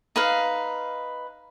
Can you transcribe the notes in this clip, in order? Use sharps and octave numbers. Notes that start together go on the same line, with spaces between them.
D#4 B4 F5